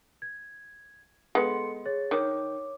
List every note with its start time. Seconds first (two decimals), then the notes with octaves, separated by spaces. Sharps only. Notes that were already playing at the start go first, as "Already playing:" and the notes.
0.22 G#6
1.35 G#3 B3 A4 C6 C#7
1.85 G#4 C#5 A6
2.11 D#3 C#5 D6